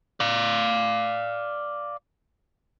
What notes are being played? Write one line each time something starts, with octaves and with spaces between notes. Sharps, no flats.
D5 F5